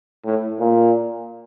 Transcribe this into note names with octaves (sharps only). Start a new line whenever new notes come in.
A2
A#2